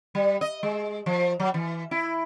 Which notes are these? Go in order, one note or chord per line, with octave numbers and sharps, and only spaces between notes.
G3
D#5
G#3
F3
F#3
E3
E4